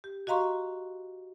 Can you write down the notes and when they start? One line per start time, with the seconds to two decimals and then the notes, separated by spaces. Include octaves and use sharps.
0.04 G4
0.27 F#4 D#5 F5 A#5 C6 C#6